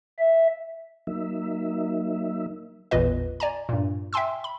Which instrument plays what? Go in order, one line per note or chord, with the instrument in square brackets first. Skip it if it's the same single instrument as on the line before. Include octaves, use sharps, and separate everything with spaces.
[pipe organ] E5
[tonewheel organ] F#3 A#3 D#4 E5
[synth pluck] A1 E2 A#2 F4 B4 D#5
D5 G#5 A#5
G2 A#2
E5 G5 G#5 C6 E6
B5